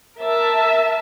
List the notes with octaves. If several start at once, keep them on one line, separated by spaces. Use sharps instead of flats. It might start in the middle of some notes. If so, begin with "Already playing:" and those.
A#4 E5 A5